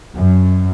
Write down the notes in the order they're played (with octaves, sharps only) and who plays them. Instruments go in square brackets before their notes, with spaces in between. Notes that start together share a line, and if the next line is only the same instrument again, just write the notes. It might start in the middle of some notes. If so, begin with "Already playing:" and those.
[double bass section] F#2